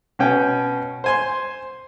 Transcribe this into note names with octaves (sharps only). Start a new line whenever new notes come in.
B2 B3 C#4 G5 G#5
C5 G#5 C6